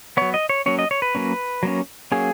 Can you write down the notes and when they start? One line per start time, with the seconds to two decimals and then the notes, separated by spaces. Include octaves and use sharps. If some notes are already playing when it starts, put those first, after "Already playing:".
0.17 F#3 B3 C#5
0.34 D#5
0.49 C#5
0.66 F#3 A#3 C#4 C#5
0.79 D#5
0.91 C#5
1.02 B4
1.15 F#3 A#3 C#4
1.63 F#3 A#3 C#4
2.12 F#3 A#3 C#4 G#4